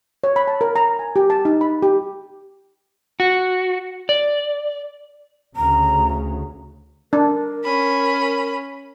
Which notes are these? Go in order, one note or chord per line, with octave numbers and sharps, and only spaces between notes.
C#5
B5
A5
A#4
A#5
G#5
G4
A5
D#4
B5
G4
F#4
D5
D2 C#3 A#5
D4 A#4
C#4 B5